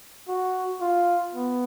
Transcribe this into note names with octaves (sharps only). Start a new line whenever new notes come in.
F#4
F4
B3